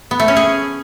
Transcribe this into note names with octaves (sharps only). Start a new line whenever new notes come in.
B3
A3
C#4
G#4